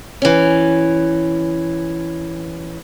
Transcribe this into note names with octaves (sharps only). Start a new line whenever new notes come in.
E3 C#4